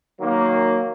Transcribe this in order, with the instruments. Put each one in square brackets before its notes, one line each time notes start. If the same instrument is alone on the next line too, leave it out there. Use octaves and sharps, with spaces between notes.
[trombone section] D#3 F#3 A#3